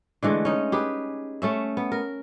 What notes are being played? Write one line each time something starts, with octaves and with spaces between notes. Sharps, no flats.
D3 E3 G#3 A3
C#4 D#4
G4 G#4 B4
A3 C#4 E5
B3
A#4